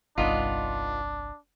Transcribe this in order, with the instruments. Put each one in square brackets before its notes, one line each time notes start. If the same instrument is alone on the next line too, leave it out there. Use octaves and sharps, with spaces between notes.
[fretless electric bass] G1 C2 [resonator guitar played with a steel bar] B3 D#4 F4 [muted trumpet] D4